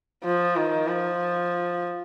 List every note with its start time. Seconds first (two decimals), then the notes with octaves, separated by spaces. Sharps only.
0.24 F3
0.56 D#3
0.87 F3